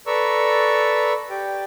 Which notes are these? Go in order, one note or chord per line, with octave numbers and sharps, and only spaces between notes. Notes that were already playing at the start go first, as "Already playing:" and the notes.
A4 B4 D5 A#5 C#6 E6
G4 D5 G5